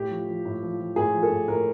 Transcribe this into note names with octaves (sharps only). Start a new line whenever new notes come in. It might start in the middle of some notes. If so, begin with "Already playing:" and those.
Already playing: A2 G4
F3
F3
A2
F3
F3
A2 G#4
F3
A4
A2
A2 A#4